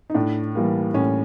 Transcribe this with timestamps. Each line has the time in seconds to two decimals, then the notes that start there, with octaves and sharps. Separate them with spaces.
0.10 D#4
0.14 A2 D4
0.55 E3 G3 A#3
0.94 A2 C#4